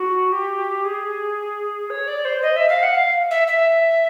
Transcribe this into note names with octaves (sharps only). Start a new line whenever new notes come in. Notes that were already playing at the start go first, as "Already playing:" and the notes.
Already playing: F#4
G4
G#4
C#5
D5
C5
D#5
E5
F5
F#5
F5
E5
E5